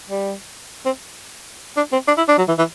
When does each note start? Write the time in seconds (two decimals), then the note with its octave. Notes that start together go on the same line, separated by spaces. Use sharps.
0.09 G3
0.85 C4
1.77 D4
1.92 C4
2.07 D4
2.17 E4
2.28 D4
2.38 F#3
2.48 E3
2.58 E3